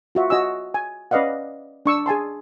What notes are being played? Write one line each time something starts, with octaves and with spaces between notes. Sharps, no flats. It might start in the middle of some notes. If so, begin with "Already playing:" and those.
F4 F#4 E5
F#4 D#5 G#5 E6
G#5
C#4 B4 D5 D#5 F5 F#5
D4 C#6 E6
G#4 G#5 A5 C6